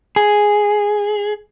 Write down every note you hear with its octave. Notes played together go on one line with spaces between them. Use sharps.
G#4